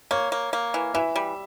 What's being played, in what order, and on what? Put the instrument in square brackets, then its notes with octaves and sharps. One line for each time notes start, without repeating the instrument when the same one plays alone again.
[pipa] A#3 [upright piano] C#5
[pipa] A#3
A#3
E3
[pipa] E3 [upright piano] E5
[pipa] G3